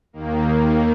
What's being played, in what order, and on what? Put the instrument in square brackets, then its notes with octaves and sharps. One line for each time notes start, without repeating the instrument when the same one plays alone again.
[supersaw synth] D#2 D#3 A#3